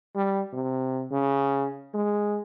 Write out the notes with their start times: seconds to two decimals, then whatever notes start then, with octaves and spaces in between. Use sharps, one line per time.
0.15 G3
0.53 C3
1.12 C#3
1.94 G#3